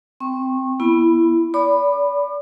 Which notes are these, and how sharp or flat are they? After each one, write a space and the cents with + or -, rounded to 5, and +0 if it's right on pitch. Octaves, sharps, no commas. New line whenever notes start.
C4 -10 G5 +10 C#6 -30
B3 -25 E4 +15 B5 +0
D5 -40 B5 +0 D6 +35